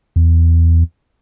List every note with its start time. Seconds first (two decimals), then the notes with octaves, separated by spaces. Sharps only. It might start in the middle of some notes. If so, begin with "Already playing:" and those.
0.16 E2